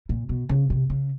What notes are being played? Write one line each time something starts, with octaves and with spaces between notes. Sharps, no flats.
A#2
B2
C#3
C3
C#3